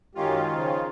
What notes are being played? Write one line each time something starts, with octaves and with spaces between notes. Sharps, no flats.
F#2 D#3 G#3 C#4 F4 G4
C#3 F3